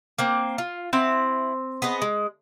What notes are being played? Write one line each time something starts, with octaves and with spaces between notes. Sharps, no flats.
A#3 C4
F4
C4 E4 F#5
B3 G#4 D#5
G#3